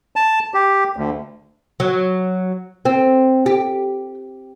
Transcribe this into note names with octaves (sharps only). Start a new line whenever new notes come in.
A5
G4
D2
F#3
C4
G4